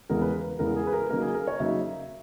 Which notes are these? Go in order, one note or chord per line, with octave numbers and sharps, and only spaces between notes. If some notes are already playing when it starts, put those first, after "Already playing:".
E2 C#3 E3 G#3 B3 A#4
B4
E2 C#3 E3 G#3 B3 A#4
G#4
B4
A#4
C#3 F#3 A#3 D#4 A#4
G#4
A#4
C#5
C#3 F#3 A#3 D#4 E5